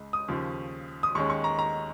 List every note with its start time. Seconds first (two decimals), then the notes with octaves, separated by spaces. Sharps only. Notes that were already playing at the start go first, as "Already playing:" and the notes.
Already playing: C#2 G#3
0.13 D#6
0.28 D#2 C#3 F3
1.03 D#6
1.15 D#2 D#3 G#3 C#4 C#6
1.30 C#6
1.44 A#5
1.59 A#5